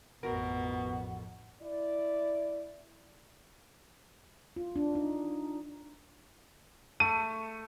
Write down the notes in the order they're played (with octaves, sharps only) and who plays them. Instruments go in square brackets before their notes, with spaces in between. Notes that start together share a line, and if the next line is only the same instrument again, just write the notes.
[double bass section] A1 F2 [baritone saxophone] B2 [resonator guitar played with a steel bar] F#4 A#4 [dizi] F#5
[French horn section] E4 D5
[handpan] F4
D4
D#4
[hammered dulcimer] A3 [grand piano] D#7